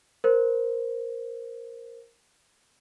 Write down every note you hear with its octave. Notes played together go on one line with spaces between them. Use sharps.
A#4 C5